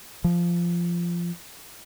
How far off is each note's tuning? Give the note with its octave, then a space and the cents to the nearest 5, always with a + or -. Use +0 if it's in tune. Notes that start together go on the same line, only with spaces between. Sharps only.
F3 -15